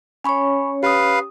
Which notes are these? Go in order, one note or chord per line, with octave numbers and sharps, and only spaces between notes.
C#4 C#5 G#5 B5 C#6
G4 B4 F5 D#6